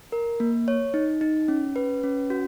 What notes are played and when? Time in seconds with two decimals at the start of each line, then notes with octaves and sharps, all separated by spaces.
0.12 A#4
0.40 A#3
0.68 C#5
0.94 D#4
1.21 D#4
1.48 C#4
1.76 B4
2.03 C#4
2.30 F#4